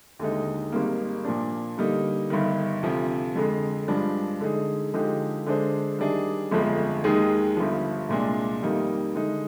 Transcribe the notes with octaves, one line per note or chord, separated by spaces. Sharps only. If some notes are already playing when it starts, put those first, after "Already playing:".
D#2 D3 G#3 D#4
G#1 G#2 G3 A#3
A#2 F3 A#3 D4
D3 G3 A#3 D#4
G1 G2 D#3
D2 C3 F3
F2 D3 G#3
G2 F3 G#3 D4
D3 G#3 D#4 G#4
D3 F3 G#3 D#4 G4
D3 G#3 D4 G#4 C5
D#3 G3 D4 G#4 D#5
G1 F2 D3 F3 G#3
D#2 D#3 G#3 D#4 G#4
G1 G2 F3
C2 A#2 G#3 D4
F2 D#3 G3 A#3 D#4
D3 G#3 D#4